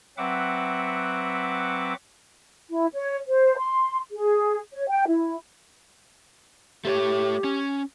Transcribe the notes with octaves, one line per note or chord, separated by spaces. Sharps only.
F#3 C4 B4 E5 F#5 D6
E4
C#5
C5
C6
G#4
C#5
G5
E4
A3 G4 C5 C#5
C#4